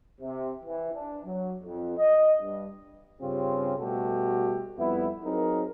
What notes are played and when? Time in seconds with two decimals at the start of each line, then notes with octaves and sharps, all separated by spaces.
0.21 C3
0.64 E3
0.93 D4
1.25 F#3
1.63 F2
1.98 D#5
2.42 G2
3.21 G2 C#3 C4 C#4 F4 G4
3.79 B2 G3 A3 F#4 G4 A4
4.78 F2 G3 B3 E4
5.25 F#3 C4 D#4 G#4 A#4